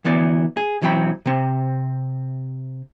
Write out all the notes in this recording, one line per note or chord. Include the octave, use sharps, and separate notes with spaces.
D2 E3 B3 D5
G#4
B1 E3 F#3 C4 G5 B5
C3 C4